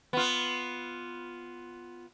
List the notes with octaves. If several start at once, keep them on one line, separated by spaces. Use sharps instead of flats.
B3 F4